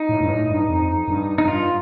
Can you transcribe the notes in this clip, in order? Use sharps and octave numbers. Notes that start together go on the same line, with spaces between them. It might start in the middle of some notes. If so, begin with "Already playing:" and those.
Already playing: D#4
A2
G2
A2
G2
F2
G2
D#4
G2 F4